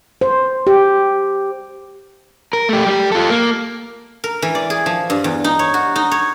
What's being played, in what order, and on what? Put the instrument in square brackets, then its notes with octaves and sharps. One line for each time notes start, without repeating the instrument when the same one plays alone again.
[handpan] C5
G4
[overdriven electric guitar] A#4
A3 G4
G3 G4
F4 A4
A#3
[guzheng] A#4
E3
D5
G#4
F3
G2
E2
D#4
C#5
F#4
D#4
C#5